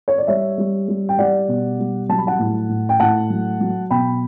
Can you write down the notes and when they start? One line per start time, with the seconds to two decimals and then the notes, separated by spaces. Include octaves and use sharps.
0.08 C#5
0.18 D5
0.27 G3 C#5 E5
0.58 G3
0.88 G3
1.09 G5
1.18 G3 D5 F#5
1.48 B2
1.79 G3
2.09 F#3 A5
2.18 B5
2.27 F#5 A5
2.39 A2
2.69 A2
2.89 G5
3.00 A2 F#5 A5
3.30 F#3
3.61 F#3
3.90 B2 G5 B5